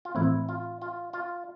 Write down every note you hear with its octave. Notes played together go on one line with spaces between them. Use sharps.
F4
A2 E3 A3 C4 E4
F4
F4
F4